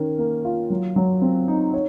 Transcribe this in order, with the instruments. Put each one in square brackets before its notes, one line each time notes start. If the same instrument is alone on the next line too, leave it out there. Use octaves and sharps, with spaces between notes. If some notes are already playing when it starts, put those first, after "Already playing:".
Already playing: [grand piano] D#3 C#4 A#4
A#3
F4
F#3
F#3
C4
D#4
C#5